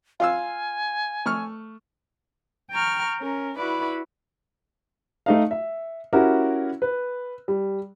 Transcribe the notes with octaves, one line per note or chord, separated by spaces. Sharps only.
F4 F5 G#5 E6
A3 C#6 F6
G5 A#5 C#6 F6
C#4 A#4
E4 F#4 B4 D5 B5
A3 D#4 F5
E5
C#4 E4 F#4 G4 A#4
B4
G3